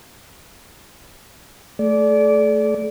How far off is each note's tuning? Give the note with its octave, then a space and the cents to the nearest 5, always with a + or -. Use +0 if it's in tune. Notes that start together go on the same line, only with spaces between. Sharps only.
A3 +0 A4 -45 D5 -15